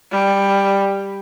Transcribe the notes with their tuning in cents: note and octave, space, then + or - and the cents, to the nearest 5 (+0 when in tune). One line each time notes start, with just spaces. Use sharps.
G3 +10